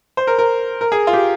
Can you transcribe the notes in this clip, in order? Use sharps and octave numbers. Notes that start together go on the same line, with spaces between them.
C5
A#4
A#4
A#4
G#4
F4
G4